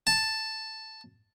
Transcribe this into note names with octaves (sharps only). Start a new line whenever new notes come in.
A5